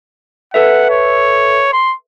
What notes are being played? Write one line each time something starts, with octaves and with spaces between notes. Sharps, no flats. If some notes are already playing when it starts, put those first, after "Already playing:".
A4 B4 E5 F#5
C#5
C6